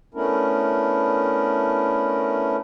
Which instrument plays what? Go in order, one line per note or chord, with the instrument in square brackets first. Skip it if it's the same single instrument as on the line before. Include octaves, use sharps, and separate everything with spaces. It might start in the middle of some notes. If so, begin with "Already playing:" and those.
[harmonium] A3 B3 C#4 D4 E4 A#4